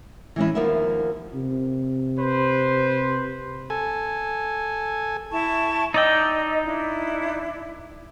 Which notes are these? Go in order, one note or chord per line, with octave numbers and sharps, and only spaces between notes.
E3 G#3 C#4 E4
D#2 F3 A#3 B3 E5
C3
B4 C5
A4 G#5
E4 A5 C#6
D#4 D5 D#5 G5 E6
D4 E4